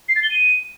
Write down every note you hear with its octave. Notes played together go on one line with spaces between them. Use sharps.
C7
A6
G7
D#7